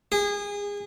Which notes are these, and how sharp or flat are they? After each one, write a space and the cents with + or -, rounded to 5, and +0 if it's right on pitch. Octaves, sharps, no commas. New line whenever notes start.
G#4 -30